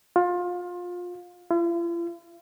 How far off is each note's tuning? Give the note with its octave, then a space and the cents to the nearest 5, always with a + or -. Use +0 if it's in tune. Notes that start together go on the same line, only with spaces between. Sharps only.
F4 +25
F4 -45